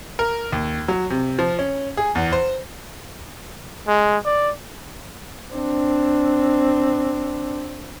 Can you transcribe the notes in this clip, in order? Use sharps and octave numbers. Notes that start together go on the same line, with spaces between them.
A#4
D#2
F#3
C3
F3
C#4
G#4
E2
C5
G#3
D5
C4 D4